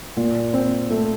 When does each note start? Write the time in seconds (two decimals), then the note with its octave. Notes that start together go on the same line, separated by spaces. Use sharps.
0.17 A#2
0.54 C4
0.90 A3